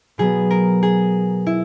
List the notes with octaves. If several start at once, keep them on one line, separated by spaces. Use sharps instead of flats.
B2 F#3 B3 G#4
A#4
G#4
E4